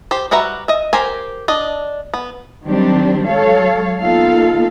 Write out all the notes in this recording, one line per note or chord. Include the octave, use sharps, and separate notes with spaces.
G4 C5
G3 F#4 B4 E5 A#5
D#5 E5
G4 A#4 C5 G#5
D4 D#5
B3
D#3 F#3 G3 C4 D4 G4
F#3 G#3 A4 C#5 F5
A#3 B3 D#4 F4 A4 F5